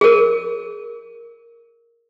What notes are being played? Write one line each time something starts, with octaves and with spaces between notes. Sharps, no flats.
G#4 A#4